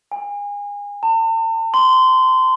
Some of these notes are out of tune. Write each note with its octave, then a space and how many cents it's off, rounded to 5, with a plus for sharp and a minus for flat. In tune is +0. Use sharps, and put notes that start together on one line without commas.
G#5 -30
A5 +45
C6 -20